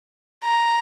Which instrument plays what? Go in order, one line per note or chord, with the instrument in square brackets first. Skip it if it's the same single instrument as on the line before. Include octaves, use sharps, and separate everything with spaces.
[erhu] A#5